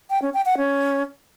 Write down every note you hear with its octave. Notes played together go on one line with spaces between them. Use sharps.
G5
C#4
G5
F#5
C#4